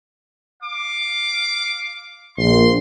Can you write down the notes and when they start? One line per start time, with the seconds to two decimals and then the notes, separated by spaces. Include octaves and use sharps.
0.63 F5 D6
2.38 A#1 C6